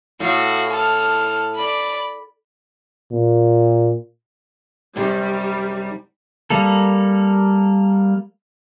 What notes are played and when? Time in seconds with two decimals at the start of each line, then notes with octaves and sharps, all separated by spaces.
0.20 A2 F#4 F5
0.70 A4 F6
1.56 D5 B5
3.11 A#2
4.96 F#2 C3 D#3 G3
6.50 G3 A#3 A4